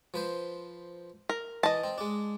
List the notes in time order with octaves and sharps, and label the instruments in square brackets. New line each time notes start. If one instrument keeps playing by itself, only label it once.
[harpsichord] F3 B4 C5
[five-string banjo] A#4
[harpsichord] E3 [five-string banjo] D#5 A5
[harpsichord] C4
G#3 D4